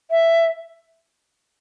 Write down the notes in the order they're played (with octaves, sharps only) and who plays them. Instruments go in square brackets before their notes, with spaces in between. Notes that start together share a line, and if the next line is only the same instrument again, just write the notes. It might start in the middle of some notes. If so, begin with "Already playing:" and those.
[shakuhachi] E5